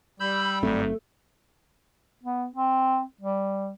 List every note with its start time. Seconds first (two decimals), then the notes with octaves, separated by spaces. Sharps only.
0.20 G3 B5 E6 G6
0.63 G1 G#2 F#3 A3 C4
2.23 B3
2.56 C4
3.21 G3